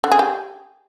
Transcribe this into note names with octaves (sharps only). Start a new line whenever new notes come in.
D3
G#4
G4